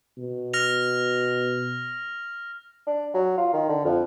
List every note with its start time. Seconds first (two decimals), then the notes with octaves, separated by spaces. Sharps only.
0.18 B2
0.53 F6 A#6 F7
2.87 D4
3.14 F#3
3.38 F4
3.53 D#3
3.69 D3
3.85 F2